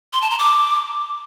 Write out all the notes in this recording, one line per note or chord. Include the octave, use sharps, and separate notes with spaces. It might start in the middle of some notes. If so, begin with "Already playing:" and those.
C6
A5
A#5
D6